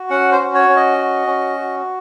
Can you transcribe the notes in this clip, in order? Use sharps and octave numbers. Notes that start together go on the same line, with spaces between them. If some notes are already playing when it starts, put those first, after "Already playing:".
Already playing: F#4
C#4 F#5
C5
F#4
C#5
C#4
D#5
F#4
C#4
F#4